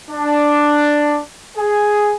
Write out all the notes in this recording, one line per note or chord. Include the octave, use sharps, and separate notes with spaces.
D4
G#4